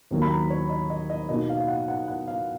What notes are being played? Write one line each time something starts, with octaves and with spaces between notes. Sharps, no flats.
D#2 D#3 F#3 A#3
B5
A#5
C#5
D#5
D#5
D#5
B2 A#3 D#4 D#5
F5
F5
F#5
F#5
F#5
F5